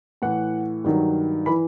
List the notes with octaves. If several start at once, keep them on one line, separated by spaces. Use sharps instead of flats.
A2 E3 F#5
G2 D#3 F#3
E3 B5